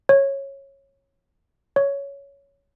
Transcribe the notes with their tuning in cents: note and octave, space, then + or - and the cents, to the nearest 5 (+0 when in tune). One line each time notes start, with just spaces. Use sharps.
C#5 -15
C#5 +10